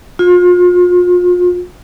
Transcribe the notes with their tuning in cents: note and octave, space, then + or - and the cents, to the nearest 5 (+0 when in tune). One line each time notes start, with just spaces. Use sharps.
F4 +35